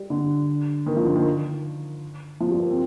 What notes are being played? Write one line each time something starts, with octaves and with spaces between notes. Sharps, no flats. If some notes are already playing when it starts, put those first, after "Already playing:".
Already playing: G3
D3
D#3
F3
D3
D#3
F3
G3
A#3
C4